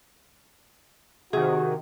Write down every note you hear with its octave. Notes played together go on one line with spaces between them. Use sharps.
C3 D#3 F#4 G#4